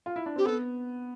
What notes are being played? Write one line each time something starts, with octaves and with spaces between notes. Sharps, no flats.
F4
E4
D4
C4 G4
B3 A4